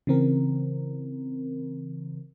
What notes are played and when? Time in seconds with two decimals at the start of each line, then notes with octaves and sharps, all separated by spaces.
0.07 C#3 E3 C4 A#4